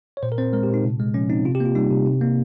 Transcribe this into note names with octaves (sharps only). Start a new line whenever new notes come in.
C#5
A#2 C5
A#4
C4 C5
G#3 A#4
G4
A#2 D#4
C3
G#3
F3 C#4
C4 D#4
C3 F4
G4
A#3
F4
G3 D#4
C3
C3
A#3